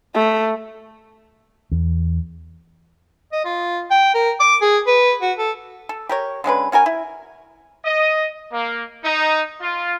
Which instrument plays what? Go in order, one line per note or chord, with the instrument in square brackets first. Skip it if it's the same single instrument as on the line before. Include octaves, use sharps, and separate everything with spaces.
[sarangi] A3
[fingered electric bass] E2
[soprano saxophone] D#5
F4
G5
A#4
D6
G#4
B4
F#4
A4
[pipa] A4
G4 A#4 C#5
D3 G#3 C#4 B4
C#4 F#4 A#4 G#5
E4
[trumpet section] D#5
A#3
D#4
F4